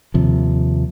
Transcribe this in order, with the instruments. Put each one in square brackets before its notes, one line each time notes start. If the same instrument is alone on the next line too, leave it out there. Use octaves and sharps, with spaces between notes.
[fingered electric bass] D#2 C3 F3